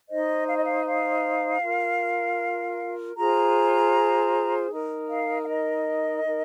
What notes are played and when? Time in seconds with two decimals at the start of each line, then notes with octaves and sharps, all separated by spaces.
0.09 D#4 C5 D#5
0.48 F5
0.56 D#5
0.64 F5
0.86 F5
1.63 F4 A#4
3.17 F4 G#4 C5 A#5
4.71 D#4 A#4
5.09 F5
5.42 F5
5.48 D#5
6.25 D#4 A#4